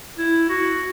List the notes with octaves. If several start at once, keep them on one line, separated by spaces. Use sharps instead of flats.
E4
F#4